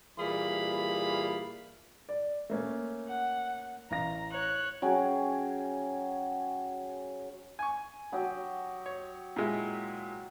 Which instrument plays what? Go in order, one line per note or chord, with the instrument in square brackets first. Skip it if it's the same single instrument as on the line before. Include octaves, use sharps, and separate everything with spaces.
[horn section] A#2 E3 G3 G#4 F5 B5
[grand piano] D5
A3 A#3 C#4
[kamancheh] F#5
[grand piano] A1 F5 A#6 [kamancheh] A#5
[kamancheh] C#5 F#6
[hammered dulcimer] F#3 C#4 G#4 G5
[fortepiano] G#5 C#6
[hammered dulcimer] F#3 G4 D#5
[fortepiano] C#5
A#2 G#3 E4